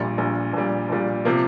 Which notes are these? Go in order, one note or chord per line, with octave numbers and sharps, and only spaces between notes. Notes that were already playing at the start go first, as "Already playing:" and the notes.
Already playing: A#1 A#2 G3
A#1 A#2 G3
A#1 A#2 G3
A#1 A#2 G3
C3 F3 A#3